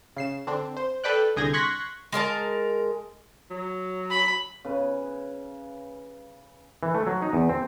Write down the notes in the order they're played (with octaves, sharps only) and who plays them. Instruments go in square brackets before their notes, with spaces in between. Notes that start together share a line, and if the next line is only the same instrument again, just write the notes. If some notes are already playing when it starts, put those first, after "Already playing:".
[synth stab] C#3 C7 E7
D3 C4 D4
C5
A4 B4 D5 G5 F#6
C2 D3 G#4 G6 G#6 A#6
C6 C#6 F#6 G#6 A#6 B6
[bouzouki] G#3 A#4 C#5 A5
[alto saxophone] F#3
[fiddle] B5
[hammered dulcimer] C#3 B4
[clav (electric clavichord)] E3
A3
F#3
D#4
E2
C4